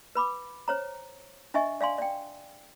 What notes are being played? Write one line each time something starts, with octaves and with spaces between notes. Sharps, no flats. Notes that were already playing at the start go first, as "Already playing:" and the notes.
B4 B5 D6
C5 C#5 A#5
D4 D#5 E5 G#5 C#6
D5 F5 G#5 C6
D5 G5